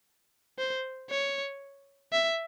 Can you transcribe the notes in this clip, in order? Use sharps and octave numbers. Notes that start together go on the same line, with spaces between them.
C5
C#5
E5